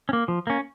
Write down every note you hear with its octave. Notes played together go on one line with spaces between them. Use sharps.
C#4
A#3
F3
A#3 C#4